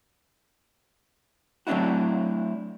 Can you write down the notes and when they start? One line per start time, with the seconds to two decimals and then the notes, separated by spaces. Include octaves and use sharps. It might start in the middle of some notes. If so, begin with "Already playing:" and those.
1.67 F#3 A3 C4 D4 E4 F#4